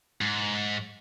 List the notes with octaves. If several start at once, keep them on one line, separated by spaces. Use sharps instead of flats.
G#2